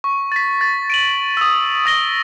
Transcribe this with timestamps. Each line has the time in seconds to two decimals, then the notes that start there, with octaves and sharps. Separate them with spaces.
0.04 C#6
0.32 A6 B6
0.61 A6
0.90 D7 D#7 F#7
1.37 D#6 E6
1.86 D#6 A#6 G7